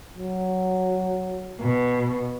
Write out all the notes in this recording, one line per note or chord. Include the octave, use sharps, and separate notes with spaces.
F#3
B2